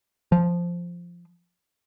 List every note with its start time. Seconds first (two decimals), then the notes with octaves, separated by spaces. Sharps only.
0.32 F3